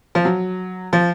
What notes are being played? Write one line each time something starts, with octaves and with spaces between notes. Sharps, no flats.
F3
F#3
F3